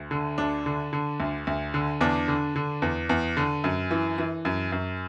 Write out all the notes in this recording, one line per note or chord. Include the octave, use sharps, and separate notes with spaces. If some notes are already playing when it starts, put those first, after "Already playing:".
Already playing: D2
D3
D2 D4
D3
D3
D2
D2
D3
E2 D4
D3
D3
E2
E2
D3
F#2
E3
E3
F#2
F#2